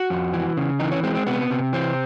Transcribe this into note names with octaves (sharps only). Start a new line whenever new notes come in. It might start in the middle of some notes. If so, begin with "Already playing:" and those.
Already playing: F#4
F2
E3
C#3
E3 D#4
C#4
G#3 C4
C4
C3 B3
C3
E3 C4